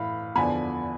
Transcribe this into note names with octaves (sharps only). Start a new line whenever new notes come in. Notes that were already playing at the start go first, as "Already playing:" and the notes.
Already playing: A2 E3 F5 B5
E2 D3 F3 G#5 B5